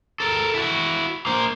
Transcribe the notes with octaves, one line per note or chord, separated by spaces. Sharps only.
A4 A#4
E4 F#4
A#3 C5